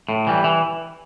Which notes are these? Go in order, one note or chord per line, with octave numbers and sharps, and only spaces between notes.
A2
E3 G3
E3